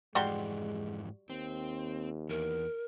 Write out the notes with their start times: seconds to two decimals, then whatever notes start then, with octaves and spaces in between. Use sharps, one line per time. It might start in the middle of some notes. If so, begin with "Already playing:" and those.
0.15 F2 G#2 E3 G3 G#3 F#4 C6
1.30 D#2 C4
2.29 E2 A#4